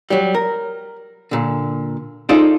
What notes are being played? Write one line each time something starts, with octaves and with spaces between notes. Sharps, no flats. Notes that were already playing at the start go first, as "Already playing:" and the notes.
F#3 G3
A#4
A#2 D3
D#4 F4 G#4 A4 C5 D5